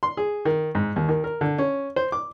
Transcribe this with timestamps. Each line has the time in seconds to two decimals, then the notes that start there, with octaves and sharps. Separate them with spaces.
0.03 C6
0.17 G#4
0.45 D#3
0.75 G#2
0.96 D#2
1.09 D#3
1.24 A#4
1.41 D3
1.58 C#4
1.96 C5
2.12 D6